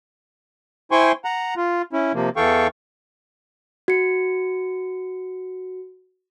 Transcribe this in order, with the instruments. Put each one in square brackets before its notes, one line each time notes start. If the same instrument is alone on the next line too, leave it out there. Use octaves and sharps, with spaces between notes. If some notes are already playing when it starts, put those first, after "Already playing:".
[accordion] E4 C5 G5 G#5 C6 C#6
F#5 A#5
F4
C#4 E4
C3 F3 A#3
E2 E3 A4 F5 G5 C#6
[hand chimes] F#4 C#7